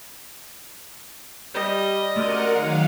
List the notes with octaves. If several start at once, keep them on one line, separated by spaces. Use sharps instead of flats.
G3 D#5
F#2 C3 A3 A#4 D5 F#5 F6 D#7
D#3 F#3 G#3 F5 F#5